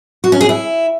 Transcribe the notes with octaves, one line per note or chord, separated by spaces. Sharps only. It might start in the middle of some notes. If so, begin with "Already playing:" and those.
F#4
C#4
G#4
E4